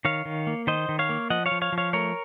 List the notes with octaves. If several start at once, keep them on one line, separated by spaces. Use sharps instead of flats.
D#3 C#5 F5
D#3
A#3
D#3 C5 D#5
D#3
C#5 F5
A#3
F3 D#5 F#5
C#5 F5
F3
C#5 F5
F3
C#5 F5
A3 A#4 C#5